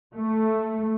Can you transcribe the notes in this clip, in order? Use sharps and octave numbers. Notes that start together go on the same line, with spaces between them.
A3